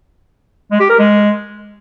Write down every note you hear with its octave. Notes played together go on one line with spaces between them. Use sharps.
G#3
G4
A#4
G#3